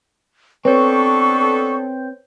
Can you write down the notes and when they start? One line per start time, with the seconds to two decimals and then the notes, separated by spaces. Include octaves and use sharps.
0.65 B3 C4 D4 A4 B4 C#5 C#6 G6